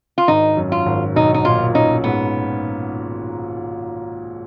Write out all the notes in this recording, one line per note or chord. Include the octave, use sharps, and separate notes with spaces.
F4
G#1 D#4
F#2
F4
G#1
B1 D#4
D#4
A#2 F4
C#4 D#4
G#2 B3